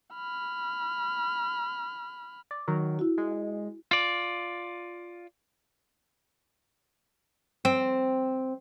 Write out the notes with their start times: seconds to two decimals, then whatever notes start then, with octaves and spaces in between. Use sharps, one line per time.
0.15 B5 F6
2.51 D5
2.68 D#3 F#3 A#4
2.99 E4 F#4
3.18 G#3
3.91 F4 D5
7.65 C4